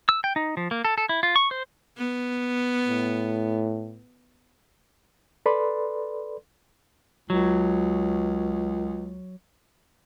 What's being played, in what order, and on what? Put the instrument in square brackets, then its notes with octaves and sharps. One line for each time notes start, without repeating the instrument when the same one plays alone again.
[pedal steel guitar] E6
G5
D#4
F3
A#3
A4
A4
E4
F4
C#6
C5
[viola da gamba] B3
[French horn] A2
[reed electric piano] A4 B4 D5 B5 C6
[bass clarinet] C#2 [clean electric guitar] F#3